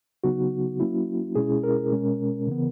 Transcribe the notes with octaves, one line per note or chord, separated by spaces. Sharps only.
C#3 F#3 B3 D#4 F#4
F#3 A#3 C#4 E4
B2 G#3 C#4 E4 G#4
A#4
B2 G#3 C#4
C#3 E3 B3